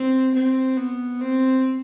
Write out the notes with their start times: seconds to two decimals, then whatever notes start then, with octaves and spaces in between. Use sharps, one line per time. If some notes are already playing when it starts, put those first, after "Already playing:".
Already playing: C4
0.34 C4
0.77 B3
1.21 C4